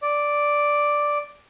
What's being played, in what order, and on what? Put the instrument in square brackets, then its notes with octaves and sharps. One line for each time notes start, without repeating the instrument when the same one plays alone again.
[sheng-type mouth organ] D5